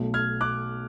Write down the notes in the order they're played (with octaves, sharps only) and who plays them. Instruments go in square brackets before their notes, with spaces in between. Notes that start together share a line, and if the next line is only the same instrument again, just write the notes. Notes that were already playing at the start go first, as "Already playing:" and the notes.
Already playing: [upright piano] B1 B2 A3
[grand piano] F6 G#6
D6 F#6